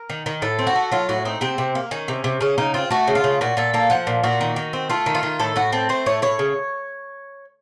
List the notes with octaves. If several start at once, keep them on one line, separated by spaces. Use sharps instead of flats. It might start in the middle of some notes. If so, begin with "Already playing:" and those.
Already playing: A#4
D#3
D#3
A2 A4
C4
F#4
A3
F#3 F4
A2 F#4
C4 D#4
C3 C4
C3
A#3
D#3 C#4
C3
C3
C#3 C#4
C#3 D#4
C4 F4
A3 F#4
C#3
F4
C#3
A#2 F#4
A#2 A4
A#3 A4
F3 F#5
A#2
A#2 F#4
D#3
D#3
C4
A3 F4
D#3
F4
D#3
A2 A4
A2 F#4
C4 A4
A3 C5
A2 C#5
A2 C#5
C#3